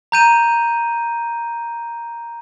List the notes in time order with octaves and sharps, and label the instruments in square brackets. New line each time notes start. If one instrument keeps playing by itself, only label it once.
[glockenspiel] A#5 G6 D#7